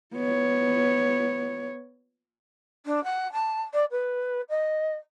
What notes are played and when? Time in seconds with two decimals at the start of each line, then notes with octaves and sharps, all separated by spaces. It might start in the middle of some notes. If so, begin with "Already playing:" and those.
0.14 B3 C#5
2.85 D4
3.04 F#5
3.33 A5
3.74 D5
3.91 B4
4.50 D#5